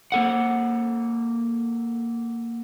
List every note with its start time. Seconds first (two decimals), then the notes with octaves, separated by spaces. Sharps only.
0.12 A#3 A4 F#5